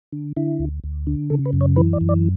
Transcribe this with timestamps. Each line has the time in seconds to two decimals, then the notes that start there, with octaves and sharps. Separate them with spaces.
0.13 D3
0.37 D3 E4
0.59 D2
0.84 D2
1.07 D3
1.30 C#3 A4
1.46 B4
1.53 F#2
1.61 C#5
1.76 E3 B4
1.93 D5
2.01 F#2
2.09 D5